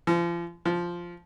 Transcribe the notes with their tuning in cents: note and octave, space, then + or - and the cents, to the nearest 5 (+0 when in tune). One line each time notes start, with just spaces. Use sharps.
F3 -35
F3 -5